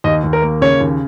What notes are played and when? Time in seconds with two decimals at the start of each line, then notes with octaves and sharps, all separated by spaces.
0.04 D#2 D#5
0.24 D#2
0.33 A#4
0.42 A#3
0.61 C#3 C#5
0.80 D#2